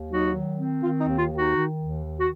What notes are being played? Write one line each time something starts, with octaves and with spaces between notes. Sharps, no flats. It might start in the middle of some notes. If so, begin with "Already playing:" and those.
Already playing: D#2
F#3 D#4 F#4
D#3
C4
D#3 F4
D#4
D#2
F4
D#3
D#4 F#4
D#3
D#2
D#3
F#4